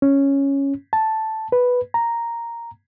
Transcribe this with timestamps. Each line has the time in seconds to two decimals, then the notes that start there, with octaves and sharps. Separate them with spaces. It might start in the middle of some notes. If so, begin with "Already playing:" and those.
0.02 C#4
0.93 A5
1.52 B4
1.94 A#5